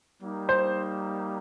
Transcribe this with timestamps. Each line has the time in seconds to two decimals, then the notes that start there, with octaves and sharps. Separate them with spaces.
0.19 G3 A#3 D#4
0.49 C5